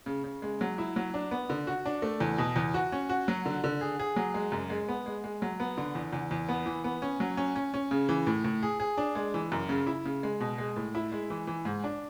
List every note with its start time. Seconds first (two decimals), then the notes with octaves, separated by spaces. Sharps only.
0.06 C#3
0.24 C#3
0.42 G#3
0.61 F#3
0.78 E4
0.96 F#3
1.14 D4
1.31 B3
1.50 D3
1.67 F#4
1.86 D4
2.02 A3
2.20 E2
2.38 B2
2.56 E2
2.74 F#4
2.92 C#4
3.09 F#4
3.28 F#3
3.46 D3
3.64 D3
3.81 G#4
4.00 G#4
4.16 F#3
4.34 G#3
4.52 F#2
4.70 G#3
4.88 B3
5.06 G#3
5.24 G#3
5.42 F#3
5.60 B3
5.78 D3
5.95 E2
6.13 E2
6.31 E2
6.49 B3
6.66 E3
6.84 B3
7.02 C#4
7.20 F#3
7.37 C#4
7.55 C#4
7.74 C#4
7.91 C#3
8.09 E3
8.27 A2
8.44 A2
8.63 G#4
8.80 G#4
8.97 D4
9.15 G#3
9.34 E3
9.52 F#2
9.69 C#3
9.87 E4
10.05 C#3
10.23 G#3
10.40 B2
10.58 G#3
10.76 A2
10.95 E4
11.12 G#3
11.30 E3
11.47 E3
11.65 G#2
11.84 D4